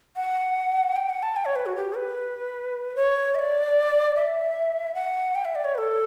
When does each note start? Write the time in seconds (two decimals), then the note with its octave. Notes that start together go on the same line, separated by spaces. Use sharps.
0.16 F#5
0.96 G5
1.09 F#5
1.23 A5
1.36 G5
1.45 C#5
1.56 B4
1.66 F#4
1.76 G4
1.96 B4
2.96 C#5
3.35 E5
3.39 D5
4.15 E5
4.95 F#5
5.35 G5
5.45 E5
5.55 D5
5.65 C#5
5.75 B4
5.78 A4